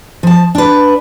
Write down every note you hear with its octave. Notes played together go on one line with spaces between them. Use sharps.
F3 A5
D4 B4